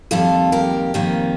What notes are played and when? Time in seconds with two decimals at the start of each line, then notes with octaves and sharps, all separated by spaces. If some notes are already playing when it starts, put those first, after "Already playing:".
0.11 F2 D#3 G3 A#3 F4 A4
0.52 G4 A#4
0.94 F2 D#3 G3 A#3